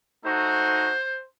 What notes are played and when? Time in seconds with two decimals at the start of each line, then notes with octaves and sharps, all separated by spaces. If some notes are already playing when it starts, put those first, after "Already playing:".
0.24 A3 D#4 F#4 C5